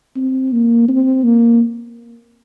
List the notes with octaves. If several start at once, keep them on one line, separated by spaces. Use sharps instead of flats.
C4
A#3
C4
A#3